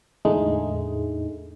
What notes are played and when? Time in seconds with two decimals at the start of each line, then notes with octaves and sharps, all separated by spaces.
0.25 E2 A2 D3 G#3 A3 D#4